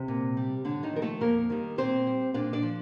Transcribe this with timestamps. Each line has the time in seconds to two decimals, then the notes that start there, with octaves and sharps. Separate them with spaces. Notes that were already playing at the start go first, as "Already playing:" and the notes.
Already playing: C3 C4
0.08 A#2
0.37 G3
0.64 A2 D3 D4
0.83 D#3 D#4
0.93 F3 A#4
1.02 A3 A4
1.21 F2 A#3 A#4
1.50 D#3 G3
1.78 A#2 C4 C5
2.07 G3
2.34 A#2 D4 D5
2.53 D4 D5
2.63 F3